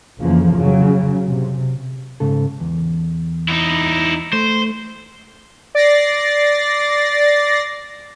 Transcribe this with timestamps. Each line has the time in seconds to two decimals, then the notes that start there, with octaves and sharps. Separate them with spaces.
0.21 F2 C#3 E3 F3 A#3
0.56 C#3 F#3
1.27 C3
2.20 G#2 C#3 A4
2.60 E2
3.48 D#4 E4
4.33 A3 C5
5.75 D5 A6 A#6 C7